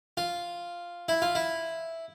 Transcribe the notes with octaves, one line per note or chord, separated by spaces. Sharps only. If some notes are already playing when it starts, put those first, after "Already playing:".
F4
E4
F4
E4